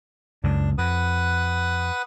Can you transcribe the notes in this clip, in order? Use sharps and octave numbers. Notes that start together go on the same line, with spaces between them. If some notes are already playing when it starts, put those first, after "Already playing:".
C#2 F#2 D4
F2 B4 F#5 D#6